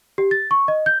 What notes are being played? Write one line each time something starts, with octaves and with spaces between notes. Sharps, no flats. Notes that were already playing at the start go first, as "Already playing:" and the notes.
G4
A6
C#6
D#5
G6